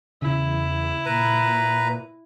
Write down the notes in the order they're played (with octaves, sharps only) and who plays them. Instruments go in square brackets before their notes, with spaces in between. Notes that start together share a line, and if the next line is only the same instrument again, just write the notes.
[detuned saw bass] E2 [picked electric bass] C#3 [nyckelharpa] E4
[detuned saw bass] A#2 [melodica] B4 A#5